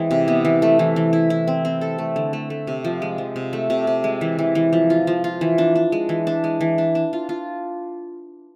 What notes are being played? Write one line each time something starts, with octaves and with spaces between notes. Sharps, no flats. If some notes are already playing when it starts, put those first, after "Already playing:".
Already playing: E3 G#3 C4 G#4
C3
B3
E3
A3
E3
E3
E4
E4
C4
C4
A4
A3
D3
A3
A3
C3
F3
G#3
F3
C3
A3
C3
C3
G#3
E3
E3
E3
F3
F4
F3
F4
E3
D4
D4
G#3
E3
D4
G#3
E3
D4
D4
F4
F4